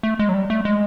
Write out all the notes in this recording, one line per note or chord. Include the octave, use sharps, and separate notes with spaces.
A3
G#3
F#3
G3
A3
G#3